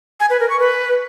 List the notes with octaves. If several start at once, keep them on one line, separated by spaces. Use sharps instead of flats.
G#5
B4
A#4
C#6
B4